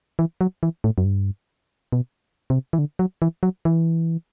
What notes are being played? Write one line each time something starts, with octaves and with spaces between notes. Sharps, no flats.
E3
F#3
E3
A2
F#2
G2
B2
C3
E3
D3
F#3
E3
F#3
E3